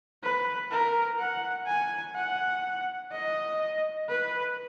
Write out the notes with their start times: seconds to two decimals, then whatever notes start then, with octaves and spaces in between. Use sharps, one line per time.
0.23 B4
0.71 A#4
1.18 F#5
1.67 G#5
2.15 F#5
3.12 D#5
4.09 B4